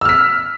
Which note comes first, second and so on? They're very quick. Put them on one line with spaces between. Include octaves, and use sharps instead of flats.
E6 F6 B6